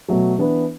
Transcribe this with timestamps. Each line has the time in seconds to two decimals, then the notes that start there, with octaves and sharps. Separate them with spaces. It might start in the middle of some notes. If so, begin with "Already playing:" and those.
0.08 B2 F#3 A3
0.38 E3 B3 D4 B4